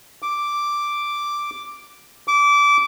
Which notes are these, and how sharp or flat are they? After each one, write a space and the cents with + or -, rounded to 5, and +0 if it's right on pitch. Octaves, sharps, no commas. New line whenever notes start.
D6 +0
D6 -20